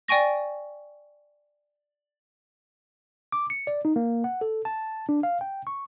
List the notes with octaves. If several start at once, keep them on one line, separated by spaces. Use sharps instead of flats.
D5 G5 G#5 C#6 A#6
D6
C#7
D5
D#4
A#3
F#5
A4
A5
D4
F5
G5
C#6